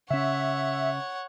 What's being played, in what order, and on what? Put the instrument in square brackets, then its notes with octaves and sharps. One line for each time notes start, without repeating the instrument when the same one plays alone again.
[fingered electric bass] C#3 C#4 [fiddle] C#5 F#5 [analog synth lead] E5